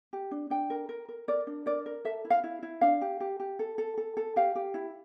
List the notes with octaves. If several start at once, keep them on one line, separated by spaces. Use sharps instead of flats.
G4
D4
D4 G5
A#4
A#4
A#4
A#4 D5
D4
A#4 D5
A#4
A4 E5
E4
F5
E4
E4
D4 F5
G4
G4
G4
A4
A4
A4
A4
G4 F5
G4
E4